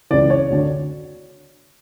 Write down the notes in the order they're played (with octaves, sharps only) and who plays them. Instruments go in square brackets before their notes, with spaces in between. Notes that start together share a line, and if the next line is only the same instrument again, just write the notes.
[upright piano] C#2 C#3 E3 D5
C#5
D2 D3